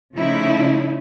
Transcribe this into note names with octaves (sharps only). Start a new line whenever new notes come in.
C#3 F3 A3 C#4 D#4 E4